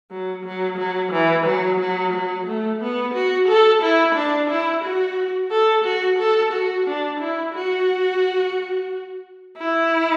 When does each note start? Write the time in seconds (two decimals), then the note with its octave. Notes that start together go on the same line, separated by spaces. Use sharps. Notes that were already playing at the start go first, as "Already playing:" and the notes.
0.11 F#3
0.45 F#3
0.78 F#3
1.12 E3
1.46 F#3
1.80 F#3
2.14 F#3
2.47 A3
2.81 B3
3.14 F#4
3.48 A4
3.82 E4
4.15 D4
4.50 E4
4.84 F#4
5.51 A4
5.84 F#4
6.19 A4
6.52 F#4
6.87 D4
7.20 E4
7.54 F#4
9.56 E4